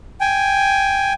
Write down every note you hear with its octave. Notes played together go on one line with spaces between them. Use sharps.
G5 G#5